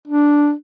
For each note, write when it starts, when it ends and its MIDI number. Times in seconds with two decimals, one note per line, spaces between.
0.08 0.52 62